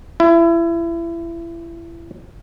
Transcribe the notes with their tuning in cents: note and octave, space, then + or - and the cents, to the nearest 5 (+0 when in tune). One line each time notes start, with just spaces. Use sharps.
E4 +30